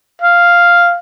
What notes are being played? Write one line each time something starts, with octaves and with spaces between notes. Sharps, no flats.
F5